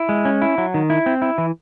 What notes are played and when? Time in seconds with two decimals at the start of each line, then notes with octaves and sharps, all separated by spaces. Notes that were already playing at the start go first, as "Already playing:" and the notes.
Already playing: E4
0.09 G#3
0.25 C#4
0.42 E4
0.58 F#3
0.74 D#3
0.90 E4
1.06 C4
1.22 E4
1.38 E3